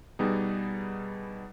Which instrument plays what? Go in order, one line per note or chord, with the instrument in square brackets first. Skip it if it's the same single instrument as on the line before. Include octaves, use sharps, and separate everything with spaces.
[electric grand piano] B2 G3 B3 D#4 G#4